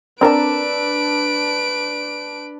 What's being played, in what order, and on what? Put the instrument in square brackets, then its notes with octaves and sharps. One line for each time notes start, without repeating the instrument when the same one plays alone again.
[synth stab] C4 A#4 [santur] D4 E6 [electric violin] B4 D7